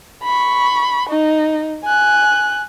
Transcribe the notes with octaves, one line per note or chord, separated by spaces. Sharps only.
B5 C#6
D#4
G#5 F#6